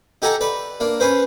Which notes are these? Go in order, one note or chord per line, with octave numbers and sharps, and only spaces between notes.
D#4 G4 A4 F#5 G#5 A#5
B4 D5
A#3 D4
C#4 G#4 B4 C5